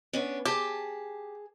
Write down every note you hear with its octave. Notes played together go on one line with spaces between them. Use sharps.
B3 C#4 D4
G4 G#4 A5